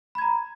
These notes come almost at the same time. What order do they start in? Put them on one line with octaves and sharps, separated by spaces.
B5 G#6 A#5